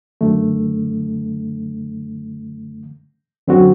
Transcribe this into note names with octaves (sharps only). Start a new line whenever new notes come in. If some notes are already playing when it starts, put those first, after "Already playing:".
F#2 D3 A3
F#2 D3 F#3 C4 F#4